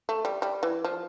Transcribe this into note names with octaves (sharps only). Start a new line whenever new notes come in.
A3
G3
G3
E3
F3